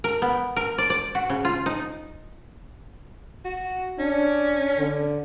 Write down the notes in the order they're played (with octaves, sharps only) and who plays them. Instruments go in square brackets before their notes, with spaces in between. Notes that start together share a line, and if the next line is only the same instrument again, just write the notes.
[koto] A#4
B3
A#4
D5
D5
F#4
C#3
F4
D#4
[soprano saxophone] F#4
[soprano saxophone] C#4 [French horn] D4
[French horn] D3